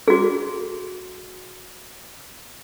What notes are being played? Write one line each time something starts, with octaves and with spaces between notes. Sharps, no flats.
F#4 G#4